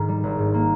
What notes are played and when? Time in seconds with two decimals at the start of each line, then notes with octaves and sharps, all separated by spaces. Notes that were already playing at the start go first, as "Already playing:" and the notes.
Already playing: G#2 D#3
0.08 G3
0.24 G#1
0.39 G#2
0.54 A#3